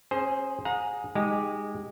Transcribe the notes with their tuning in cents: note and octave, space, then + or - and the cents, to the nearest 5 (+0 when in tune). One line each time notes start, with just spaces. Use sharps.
C#4 -35 G#4 +0 C5 +0
G#4 +0 F#5 -45 A#5 +0
G#3 -20 D#4 +0 G4 +0